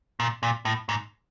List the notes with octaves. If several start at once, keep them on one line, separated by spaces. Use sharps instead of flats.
A#2
A#2
A2
G#2